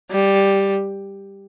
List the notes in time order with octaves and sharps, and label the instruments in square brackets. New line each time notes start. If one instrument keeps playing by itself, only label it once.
[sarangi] G3